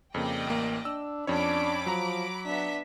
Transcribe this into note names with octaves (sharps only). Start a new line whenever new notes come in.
F2 C#3 A#3 D5 D#5 G5
A1 A#3
D4 E6
F2 C#4 D4 C#5 B5 D6
F3 F#3 A#5
B3 D4 E5 B6